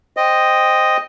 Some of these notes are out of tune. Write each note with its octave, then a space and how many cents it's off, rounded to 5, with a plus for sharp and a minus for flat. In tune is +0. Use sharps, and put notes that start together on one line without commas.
C5 +0 D#5 +0 G5 +0